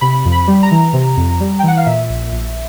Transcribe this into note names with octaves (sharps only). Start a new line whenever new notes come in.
C3 B5
F2
B5
G3
A#5
E3
C3
F2
G3
G5
E3 F#5
F5
A#2 E5
A#1
A#1